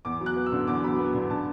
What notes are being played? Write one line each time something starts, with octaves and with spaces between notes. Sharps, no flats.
E2 D6
F#3
F#6
B3
E6
D3
E2 D6
F#3 B5
B3
D3
D3 A5